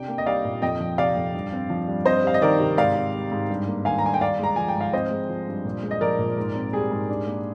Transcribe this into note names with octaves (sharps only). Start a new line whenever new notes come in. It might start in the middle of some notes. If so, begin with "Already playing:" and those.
Already playing: C3 D4 G5
A#3
D#5
G3 D5 F5
A#2
F2 D#5 G5
F3
C3 D5 F5
F2
G2
C4
F3
G2
C4 C5 D#5
G3 F5
D#5
D#3 A#4 D5
C3
G#2 D5 F5
C4
G3
G#2
G2
A#3
D#3 F5 G#5
A#5
G2 G#5
G5
D4 D5 F5
G#3 A#5
F3 G#5
G5
G#2
F5
C4 C5 D#5
G#3
F3
G2
A#2
G#3
D#5
F3 A#4 D5
A#2
G#2
C4
G3 G#4
G#2
D4
A#3